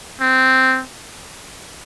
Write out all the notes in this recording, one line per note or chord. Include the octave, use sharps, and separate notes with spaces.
C4